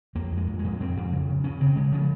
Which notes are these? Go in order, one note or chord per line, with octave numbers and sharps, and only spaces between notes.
F2 A#3
F2 G#3
F2
G#3
F2
F2 C4
F2
C#3
C#3
C#3 C#4
C#3 C4
C#3 G#3
C#3 F3